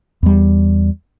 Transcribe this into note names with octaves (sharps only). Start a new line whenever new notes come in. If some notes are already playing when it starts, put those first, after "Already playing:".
E2 G3